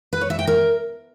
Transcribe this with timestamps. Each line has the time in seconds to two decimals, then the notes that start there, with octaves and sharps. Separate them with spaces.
0.13 B4
0.21 C#5
0.30 E5
0.39 G5
0.47 A#4